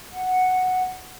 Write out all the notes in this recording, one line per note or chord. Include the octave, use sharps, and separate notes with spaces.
F#5